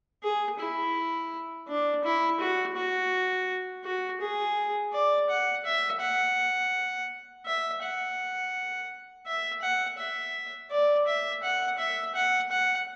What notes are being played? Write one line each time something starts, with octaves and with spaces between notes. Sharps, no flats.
G#4
E4
D4
E4
F#4
F#4
F#4
G#4
D5
F#5
E5
F#5
E5
F#5
E5
F#5
E5
D5
E5
F#5
E5
F#5
F#5